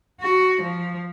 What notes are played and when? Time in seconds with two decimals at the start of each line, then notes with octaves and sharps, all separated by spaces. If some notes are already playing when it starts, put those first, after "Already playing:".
0.20 F#4
0.61 F3